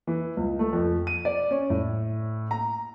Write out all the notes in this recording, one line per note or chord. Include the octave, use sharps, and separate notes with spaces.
E3
C#2
A3
F2
D#7
D5
C#4
A2
A#5